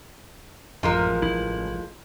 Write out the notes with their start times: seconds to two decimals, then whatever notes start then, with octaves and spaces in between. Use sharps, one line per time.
0.83 A1 F#2 F3 G#3 A#4
1.22 C2 E4